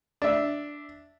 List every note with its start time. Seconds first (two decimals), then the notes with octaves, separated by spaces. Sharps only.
0.22 D4 E5